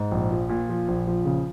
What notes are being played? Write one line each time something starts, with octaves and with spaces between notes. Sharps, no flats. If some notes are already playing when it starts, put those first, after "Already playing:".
Already playing: G#2
A#1
F3
A#2
F3
A#1
F3
C#3